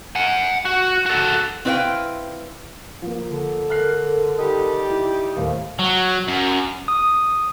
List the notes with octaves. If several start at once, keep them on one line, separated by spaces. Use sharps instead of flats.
F#5 G#5
F#4
F#4 A4
C4 E4 B4 C5 F5 G5
F3 A#3
D3
A4 A#4 F6 F#6 C7
G3 D#4 G4
E4
D#2 A2 C5 F5
F#3
F#2
D#6